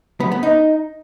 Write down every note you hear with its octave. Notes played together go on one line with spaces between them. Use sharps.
B3
B3
D#4